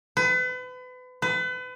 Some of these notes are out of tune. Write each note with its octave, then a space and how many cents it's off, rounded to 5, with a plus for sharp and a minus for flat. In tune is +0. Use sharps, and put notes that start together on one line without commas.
B4 +35
B4 +35